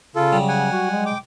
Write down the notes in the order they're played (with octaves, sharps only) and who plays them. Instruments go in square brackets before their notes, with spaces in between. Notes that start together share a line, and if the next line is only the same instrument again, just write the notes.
[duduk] C#3 [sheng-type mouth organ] F4 A4
[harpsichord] F#3 G3
[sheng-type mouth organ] F#5 G#5
[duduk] F#4
G#3
[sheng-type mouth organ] G5 D6